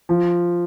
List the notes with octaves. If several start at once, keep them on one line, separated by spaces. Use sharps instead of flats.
F3